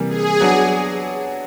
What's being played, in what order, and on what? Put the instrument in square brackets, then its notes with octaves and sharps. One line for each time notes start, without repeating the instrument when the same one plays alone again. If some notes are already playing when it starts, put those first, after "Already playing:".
Already playing: [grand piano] C3 E3 G3 A#3
[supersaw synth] G#4
[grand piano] F#3 B3 D4 F#4 [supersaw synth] G#4